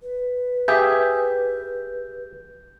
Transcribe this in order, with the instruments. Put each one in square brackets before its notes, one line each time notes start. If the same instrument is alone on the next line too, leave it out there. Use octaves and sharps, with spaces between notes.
[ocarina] B4
[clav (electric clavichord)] G4 G#4 [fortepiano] E5 [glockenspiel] G6